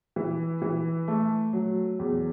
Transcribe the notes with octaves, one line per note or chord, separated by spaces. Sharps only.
E3
E3
A3
F#3
E2